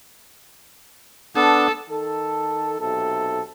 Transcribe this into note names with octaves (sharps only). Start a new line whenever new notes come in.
B3 D4 A4
D#3 A4
B1 C3 A4